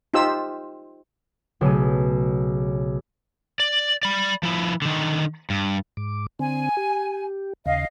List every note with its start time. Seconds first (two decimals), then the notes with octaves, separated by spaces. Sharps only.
0.14 D#4 F4 G4 C5 E6
1.61 B1 C#3 A3 D#7
3.60 D5
4.03 D5 B5
4.43 F3 E4
4.82 D3 D#3
5.50 G2
5.97 G#2 D6
6.39 D3 C4 G#5
6.77 G4
7.66 D#2 C#3 D#5 F5